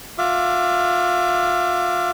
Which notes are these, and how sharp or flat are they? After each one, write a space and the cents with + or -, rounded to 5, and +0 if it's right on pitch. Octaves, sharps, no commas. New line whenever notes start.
F4 +35 E5 +40 D6 +0